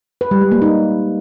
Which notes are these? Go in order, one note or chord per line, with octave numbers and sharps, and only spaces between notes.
B4
G3
G#3
A#3
D#4